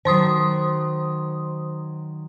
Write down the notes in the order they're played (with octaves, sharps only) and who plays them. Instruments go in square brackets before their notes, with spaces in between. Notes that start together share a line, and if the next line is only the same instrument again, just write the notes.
[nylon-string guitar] D#3 F#3 [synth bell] C5 C6 D#6